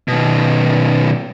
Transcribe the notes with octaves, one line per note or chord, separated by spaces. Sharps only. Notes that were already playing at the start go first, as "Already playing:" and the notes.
B2 D#3